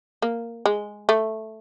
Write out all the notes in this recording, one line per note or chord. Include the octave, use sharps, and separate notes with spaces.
A#3
G#3
A3